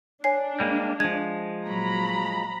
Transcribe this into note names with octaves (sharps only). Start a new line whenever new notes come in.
D4 C#5 G#5 C7
G3 G#3 A#3
F3 G#3 G#6
A#2 F#3 A#5 B5